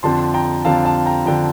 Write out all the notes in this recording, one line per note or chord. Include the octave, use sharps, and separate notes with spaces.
F2 D3 F3 A5 C6
G5 A#5
F2 D3 F3 F5 A5
F5 A5
G5 A#5
D3 F3 G5 A#5